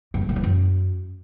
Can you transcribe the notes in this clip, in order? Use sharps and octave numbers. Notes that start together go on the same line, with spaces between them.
G2
E2
A2
E3
F#2